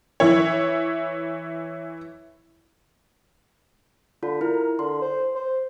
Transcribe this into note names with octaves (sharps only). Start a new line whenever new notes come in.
E3 E4 C#5
D3 F4
E4 A#4
D3 C6
C5
C5